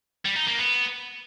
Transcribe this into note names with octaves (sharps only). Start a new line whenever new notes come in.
G3
D#4
A#3
B3